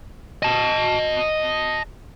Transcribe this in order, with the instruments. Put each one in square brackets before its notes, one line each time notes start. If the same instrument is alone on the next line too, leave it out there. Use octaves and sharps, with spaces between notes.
[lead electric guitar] D#5 A5